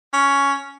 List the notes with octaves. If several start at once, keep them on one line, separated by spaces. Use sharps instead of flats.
C#4